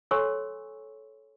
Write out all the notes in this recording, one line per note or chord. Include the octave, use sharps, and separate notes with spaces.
A4 C#5 G#5 C6 C#6 E6